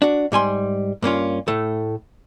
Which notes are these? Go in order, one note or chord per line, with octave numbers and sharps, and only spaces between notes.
D4 F#4
G#2 G3 G#5 C6
G2 A#3 C#4 F4
A2 A3